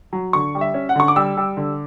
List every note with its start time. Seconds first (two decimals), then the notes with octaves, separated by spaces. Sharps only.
0.13 F#3
0.33 D3 C#6
0.55 G3
0.61 E5
0.74 C#4
0.89 F#5
0.96 D3 C#6
1.08 D6
1.16 G3 E6
1.37 G3
1.57 D3